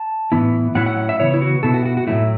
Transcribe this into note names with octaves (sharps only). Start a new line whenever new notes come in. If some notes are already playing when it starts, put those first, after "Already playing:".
Already playing: A5
A2 E3 B3 E4
A2 F#3 C#4 E4 F#5
F#5
F#5
E5
C#3 E3 B3 E4 C#5
E4
F#4
B2 B3 E4 A4
F#4
F#4
F#4
A2 F#3 A3 E4